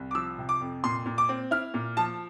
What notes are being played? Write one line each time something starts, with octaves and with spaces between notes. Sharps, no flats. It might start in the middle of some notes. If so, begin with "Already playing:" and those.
Already playing: C2
D6
F3 E6
C3
D6
F2
A#2 C6
A#2
D6
C4
E4 F6
A#2
F3 A5